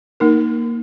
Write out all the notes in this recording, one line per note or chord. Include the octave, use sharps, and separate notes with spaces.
A#3 D#4 A#4